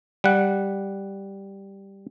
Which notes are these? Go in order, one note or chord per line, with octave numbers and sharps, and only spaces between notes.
G3 F#5